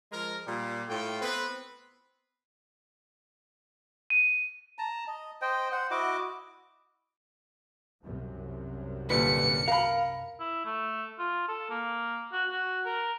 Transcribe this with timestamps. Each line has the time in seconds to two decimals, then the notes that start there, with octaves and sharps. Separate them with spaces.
0.12 F3 G#3 A#4
0.46 A#2 G3
0.88 A2 A3 F4 G5
1.22 B3 C4 B4
4.10 D#7
4.78 A5 A#5
5.08 D#5
5.42 C5 D#5 G5
5.72 C5 F#5
5.91 E4 F#4 D#5 D6
8.03 C2 F#2 C3
9.10 G2 A#2 D3 B4 C#7
9.68 A#4 F5 B5
10.40 E4
10.65 A3
11.19 F4
11.48 A4
11.70 A#3
12.32 F#4
12.51 F#4
12.86 A#4